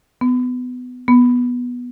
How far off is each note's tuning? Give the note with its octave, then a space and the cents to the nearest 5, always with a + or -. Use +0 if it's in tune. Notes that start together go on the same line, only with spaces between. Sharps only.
B3 +20
B3 -10